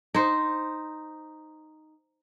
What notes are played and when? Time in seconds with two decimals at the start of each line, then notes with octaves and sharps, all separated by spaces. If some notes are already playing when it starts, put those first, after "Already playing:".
0.14 D#4 C5